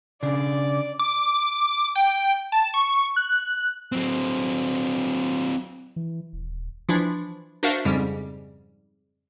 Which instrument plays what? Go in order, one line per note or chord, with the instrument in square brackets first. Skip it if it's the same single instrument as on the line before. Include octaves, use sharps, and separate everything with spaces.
[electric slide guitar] C#3 D4 [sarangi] D5
[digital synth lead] D6
G5
A5
C#6
F#6
[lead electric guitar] F#3 C4
[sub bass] E3
D#1
[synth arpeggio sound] E3 F3 D4 E4
D4 F#4 A#4 C5 E5 F5
F2 G#2 C#3 G3